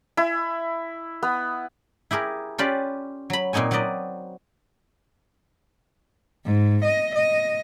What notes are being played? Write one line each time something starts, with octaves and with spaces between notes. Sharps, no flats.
E4
B3
E4 G4 G#4 A#4
C#4 F4 G4 B4 D5
F#3 B5
A#2 C4 D#4 C#5 G#5
F#3 C4 B4 D5 D#5
G#2
D#5
D#5